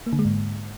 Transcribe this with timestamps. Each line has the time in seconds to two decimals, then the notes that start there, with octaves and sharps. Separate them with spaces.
0.06 A#3
0.13 D3
0.19 G#3
0.25 G#2